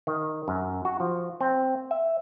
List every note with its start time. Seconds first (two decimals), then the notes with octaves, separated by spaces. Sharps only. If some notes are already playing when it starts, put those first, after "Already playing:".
0.07 D#3
0.48 F#2
0.85 F#4
1.00 F3
1.41 C4
1.91 E5